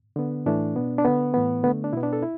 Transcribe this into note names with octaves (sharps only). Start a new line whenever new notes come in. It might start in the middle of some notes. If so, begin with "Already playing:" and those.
D3 B3
A2 E3 A3 D4
B2 B3
D4
D3 B3
A2 E3 B3
D3 A3 B3
D4
B2 B3 E4
D4
A4
E4